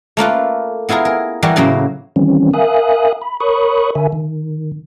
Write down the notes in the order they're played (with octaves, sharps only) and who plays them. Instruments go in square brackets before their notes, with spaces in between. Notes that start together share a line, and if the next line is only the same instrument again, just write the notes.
[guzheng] A3 A#3 F4 B4
B3 E4 F4 G#4 A#4
A#4
E3 G3 F#4 G4 A#4
A2 C#3 F#3 A#3
[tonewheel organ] D#3 E3 G3 C4 C#4
A#4 E5 F5 G#5 D#6 F#6
B5
A#4 C#5 B5 C#6 D#6 F#6
D3 A#4 E5 G#5
D#3